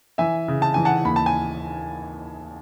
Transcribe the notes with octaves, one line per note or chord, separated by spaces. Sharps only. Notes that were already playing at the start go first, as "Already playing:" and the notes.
E3 E5 G#5
C#3
A5
E3 G#5
F#5 A5
D#2 B5
A5
G#5